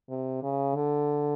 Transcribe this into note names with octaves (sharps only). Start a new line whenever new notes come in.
C3
C#3
D3